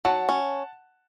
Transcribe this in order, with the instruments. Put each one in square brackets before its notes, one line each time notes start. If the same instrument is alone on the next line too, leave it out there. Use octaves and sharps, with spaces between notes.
[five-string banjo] F#3 [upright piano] F#5 A5
[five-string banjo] C#4